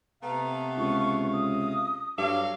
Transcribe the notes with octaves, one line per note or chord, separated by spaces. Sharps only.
C3 A3 B3 F5 A#5
C#2 C#6
D#6
G2 F#3 A4 F5 D6